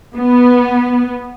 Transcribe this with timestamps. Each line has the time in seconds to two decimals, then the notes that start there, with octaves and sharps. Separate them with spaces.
0.15 B3